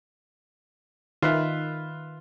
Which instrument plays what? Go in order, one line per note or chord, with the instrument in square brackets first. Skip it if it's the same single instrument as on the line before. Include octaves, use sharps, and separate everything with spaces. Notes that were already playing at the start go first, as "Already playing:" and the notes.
[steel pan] D#3 [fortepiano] F4 B4 E5